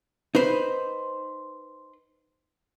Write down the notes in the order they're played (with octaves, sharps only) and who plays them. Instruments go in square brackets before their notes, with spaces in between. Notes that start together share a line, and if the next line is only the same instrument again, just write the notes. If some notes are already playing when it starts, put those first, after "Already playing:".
[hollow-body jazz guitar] D#4 B4 C5